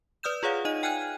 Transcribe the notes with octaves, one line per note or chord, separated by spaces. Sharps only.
B4 D5 D#6 F6 G6 E7
F4 G#4 C#5 F5 F#5
D#4 D#5 D#7
G5 G#5 F6 F#6 G#6 D#7